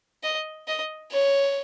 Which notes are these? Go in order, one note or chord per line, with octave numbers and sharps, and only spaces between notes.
D#5
D#5
C#5